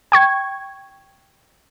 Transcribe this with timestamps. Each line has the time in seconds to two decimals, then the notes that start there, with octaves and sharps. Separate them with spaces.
0.12 G5 C#6 G#6